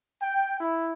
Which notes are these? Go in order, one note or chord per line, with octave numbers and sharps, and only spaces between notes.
G5
E4